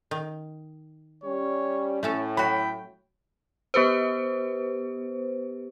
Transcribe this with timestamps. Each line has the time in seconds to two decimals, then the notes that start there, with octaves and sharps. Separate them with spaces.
0.11 D#3
1.24 G3 C#4 C#5
2.03 A2 A3 C#4 A4 C#5
2.37 F#3 F#4 G5 B5
3.74 B3 G4 B4 C5